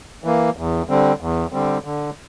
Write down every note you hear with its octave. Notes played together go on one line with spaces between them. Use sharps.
E3 A#3
E2
D3 G3 C4
E2
D3 G3 C4
D3